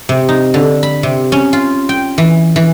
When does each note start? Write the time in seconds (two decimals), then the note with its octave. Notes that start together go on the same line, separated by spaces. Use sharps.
0.09 C3
0.29 D#4
0.54 D3
0.83 B5
1.03 C3
1.32 C#4
1.53 F4
1.89 G5
2.18 E3
2.56 E3